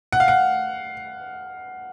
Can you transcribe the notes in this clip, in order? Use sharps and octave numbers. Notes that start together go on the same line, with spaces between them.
F#5
F5
F#5